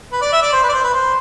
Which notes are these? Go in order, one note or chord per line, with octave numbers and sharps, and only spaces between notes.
B4
D5
E5
D5
C5
B4
D5
C5
B4
C5